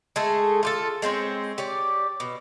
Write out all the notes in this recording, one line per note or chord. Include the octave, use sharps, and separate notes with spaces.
G#3 A3 G#4 A4
F4 G4 A4
G#3 C4 E4 C#5
G4 C#5 D5
B2